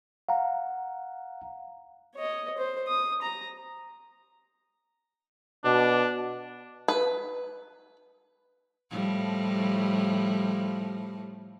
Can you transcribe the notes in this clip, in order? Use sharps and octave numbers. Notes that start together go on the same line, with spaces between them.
F5 F#5 A#5
C#5 D#5
C5
D#6
A#5
B2 D4
B4
A2 F3 G3